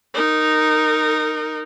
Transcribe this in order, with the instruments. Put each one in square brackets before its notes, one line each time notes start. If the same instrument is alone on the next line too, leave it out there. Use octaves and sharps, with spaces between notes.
[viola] D#4 A#4